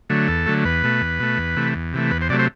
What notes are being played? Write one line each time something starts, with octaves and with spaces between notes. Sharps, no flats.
D3 F#3 A3
E2 A4
D3 F#3 A3
E2 B4
B2 A3
E2
B2 A3
E2
C3 E3 A3
E2
C3 E3 A3
E2 B4
C5
C3 F#3 A3 D5
C5